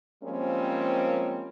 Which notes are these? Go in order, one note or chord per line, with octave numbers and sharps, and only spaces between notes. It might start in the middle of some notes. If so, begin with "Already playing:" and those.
F3 G3 G#3 A#3 C4 C#4